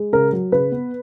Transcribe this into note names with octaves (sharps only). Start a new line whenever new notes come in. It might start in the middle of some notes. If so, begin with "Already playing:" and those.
Already playing: G#3
C#3 A#4
F#3
C#3 B4
B3